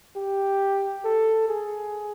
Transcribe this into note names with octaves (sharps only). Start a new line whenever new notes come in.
G4
A4
G#4